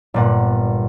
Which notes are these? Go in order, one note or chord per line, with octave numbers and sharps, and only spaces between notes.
G1 A#2 F#5